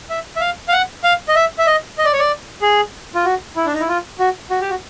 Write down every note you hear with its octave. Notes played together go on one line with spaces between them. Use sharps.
E5
E5
F5
F5
F#5
F5
D#5
E5
E5
D#5
D#5
D5
C#5
D5
G#4
F4
F#4
E4
D4
D#4
E4
F4
F#4
F#4
G4
F#4